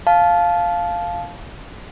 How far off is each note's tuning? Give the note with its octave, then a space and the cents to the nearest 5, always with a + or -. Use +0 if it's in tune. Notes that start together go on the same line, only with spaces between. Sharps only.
F5 +0 A5 -20